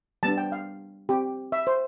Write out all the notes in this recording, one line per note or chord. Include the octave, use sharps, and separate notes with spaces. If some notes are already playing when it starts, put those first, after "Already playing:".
G3 B3 D4 A5
G5
F5
C4 G4
E5
C5